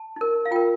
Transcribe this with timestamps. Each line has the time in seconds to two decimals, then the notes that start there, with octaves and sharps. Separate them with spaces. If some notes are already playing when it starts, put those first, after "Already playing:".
Already playing: A5
0.16 D#4 A#4
0.45 F5
0.51 F4 A#4 G5